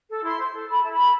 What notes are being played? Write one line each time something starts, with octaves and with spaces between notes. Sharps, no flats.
A4
E4 C6
C5
A4
A4 B5
E4 A5
B5
A4